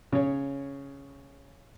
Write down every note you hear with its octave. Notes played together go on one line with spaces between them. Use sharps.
C#3 C#5